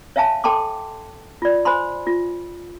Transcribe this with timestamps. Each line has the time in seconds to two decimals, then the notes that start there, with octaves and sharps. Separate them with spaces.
0.16 C#5 E5 F5 G#5 A5
0.44 A4 G5 A5 C6 D6
1.42 F4 D5
1.65 C5 G#5 B5 C6
2.07 F4